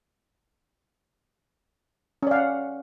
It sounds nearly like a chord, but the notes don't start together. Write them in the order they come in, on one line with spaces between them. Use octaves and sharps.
C#4 D5 F5 F#5